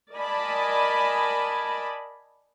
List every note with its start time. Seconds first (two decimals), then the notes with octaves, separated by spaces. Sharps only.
0.13 A#4 D5 D#5 G#5 A5 B5